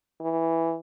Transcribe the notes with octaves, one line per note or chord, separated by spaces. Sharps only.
E3